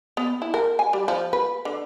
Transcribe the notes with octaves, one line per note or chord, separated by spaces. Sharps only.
B3
E4
A#4
G#5
G3
F3
B4
D3